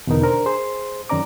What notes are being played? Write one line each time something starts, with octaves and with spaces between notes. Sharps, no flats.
E2 B2 D3 B3 D#4 A#4
D4 A#4 C5
G#4 C5 C6
F#2 D#3 C#4 D5 A#5 D6